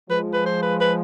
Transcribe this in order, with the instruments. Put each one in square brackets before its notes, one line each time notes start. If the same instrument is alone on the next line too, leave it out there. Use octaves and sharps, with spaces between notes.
[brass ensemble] F3 G#3 [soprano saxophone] B4
[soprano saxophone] B4
C5
B4
B4